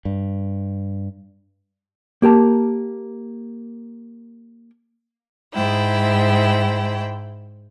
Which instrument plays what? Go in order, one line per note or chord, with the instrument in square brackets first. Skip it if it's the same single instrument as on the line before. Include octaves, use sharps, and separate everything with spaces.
[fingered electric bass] G2
[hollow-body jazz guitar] A#3 G4 A#4 A5
[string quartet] G#2 E4 G5